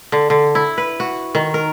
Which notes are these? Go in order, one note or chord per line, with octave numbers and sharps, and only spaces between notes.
D3
D3
E4
B4
F#4
D#3
A#4